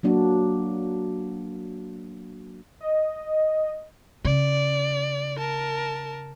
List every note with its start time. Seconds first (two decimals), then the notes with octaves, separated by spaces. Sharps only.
0.03 F#3 A#3 D4 F#4
2.81 D#5
4.25 C#3 D5
5.38 A#4 A5